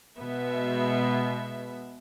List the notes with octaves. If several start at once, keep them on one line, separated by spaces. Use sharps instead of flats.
B2 G#3 B3 E5